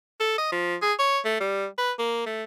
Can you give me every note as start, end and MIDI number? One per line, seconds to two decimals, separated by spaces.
0.20 0.38 69
0.38 0.50 75
0.52 0.75 53
0.82 0.93 68
0.99 1.19 73
1.25 1.36 57
1.40 1.66 55
1.78 1.92 71
1.99 2.24 58
2.27 2.44 57